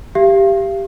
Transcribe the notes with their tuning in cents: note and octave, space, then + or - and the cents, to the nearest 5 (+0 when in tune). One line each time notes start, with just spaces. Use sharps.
G4 +0 F5 -35